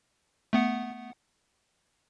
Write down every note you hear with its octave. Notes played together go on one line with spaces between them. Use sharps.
A3 B3 F#5